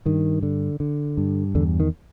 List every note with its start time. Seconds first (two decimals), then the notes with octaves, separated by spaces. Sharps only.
0.06 G2 D#3
0.43 D3
0.80 D3
1.17 G2
1.55 E2 D3
1.80 D#3